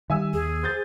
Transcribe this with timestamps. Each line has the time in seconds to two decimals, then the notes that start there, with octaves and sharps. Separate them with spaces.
0.10 D#3 G3 E5 G#5 E6
0.33 D#2 G#4
0.63 C5 G6 A6